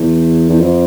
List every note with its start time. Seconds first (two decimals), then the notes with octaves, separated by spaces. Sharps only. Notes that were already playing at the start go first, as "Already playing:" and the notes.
Already playing: E2
0.49 E2
0.60 F2